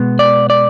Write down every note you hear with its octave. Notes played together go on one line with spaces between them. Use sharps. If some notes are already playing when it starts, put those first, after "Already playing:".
Already playing: B2 G#3 B3
D5
D5